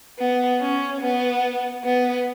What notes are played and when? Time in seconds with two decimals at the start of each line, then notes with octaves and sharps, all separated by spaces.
0.19 B3
0.60 C#4
1.01 B3
1.84 B3